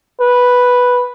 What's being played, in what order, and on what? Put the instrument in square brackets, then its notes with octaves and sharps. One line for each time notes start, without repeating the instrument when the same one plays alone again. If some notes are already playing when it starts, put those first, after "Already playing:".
[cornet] B4